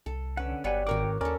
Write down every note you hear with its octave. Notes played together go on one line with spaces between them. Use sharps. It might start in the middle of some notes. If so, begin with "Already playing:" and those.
C2 A4
D3 C#4 B4 F#5
G1 F#3 G3 B3 B4 F#5 G#5
G#1 F#4 A#4 C#5 F#5 G5 D6
D#2 C#4 A4 A#4 D5 D6